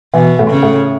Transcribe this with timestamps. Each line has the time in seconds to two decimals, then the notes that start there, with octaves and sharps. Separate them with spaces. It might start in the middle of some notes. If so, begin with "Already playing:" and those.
0.14 B2 E3
0.39 A2
0.50 C#3
0.63 A2